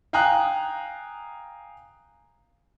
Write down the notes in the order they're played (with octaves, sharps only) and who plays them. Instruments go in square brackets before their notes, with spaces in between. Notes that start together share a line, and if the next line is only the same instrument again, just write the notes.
[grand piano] F5 G5 G#5 A#5 D#6 F#6